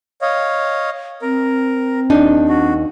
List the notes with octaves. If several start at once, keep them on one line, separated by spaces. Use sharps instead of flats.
C#5 D#5 F5
C4 A#4
D#2 D4 D#4
F#4